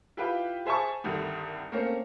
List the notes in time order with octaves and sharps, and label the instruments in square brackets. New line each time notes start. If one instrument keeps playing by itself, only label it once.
[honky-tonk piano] E4 F4 G4 B4 G5
G#4 C5 E5 G#5 A5 C#6
C2 G2 D3 D#3
A3 A#3 C4 C#4 A#4